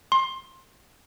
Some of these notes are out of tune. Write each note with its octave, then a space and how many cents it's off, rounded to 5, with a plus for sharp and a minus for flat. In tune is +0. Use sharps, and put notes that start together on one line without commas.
C6 +20